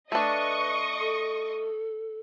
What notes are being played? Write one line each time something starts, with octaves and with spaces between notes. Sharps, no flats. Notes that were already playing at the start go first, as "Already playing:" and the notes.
A3 D4 B4 D#5 C#6 D#6
A4